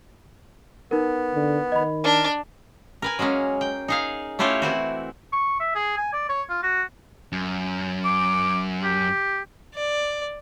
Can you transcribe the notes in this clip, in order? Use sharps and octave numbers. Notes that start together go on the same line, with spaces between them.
B3 D#4 A#4
D3
D#3 D#5 B5
D4 A#4
A#4 B4 G#5
F#3 G#3 A#3 C#4
G5
D#4 G#4 F5
A3 C#4 E4 F4 G4 C#5
E3 C4 E4 F#4
C#6
E5
G#4
G#5
D5
C#5
F4
F#4
F#2
D6
G4
D5